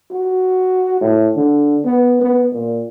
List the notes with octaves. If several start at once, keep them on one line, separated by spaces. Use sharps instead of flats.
F#4
A2
D3
B3
B3
A#2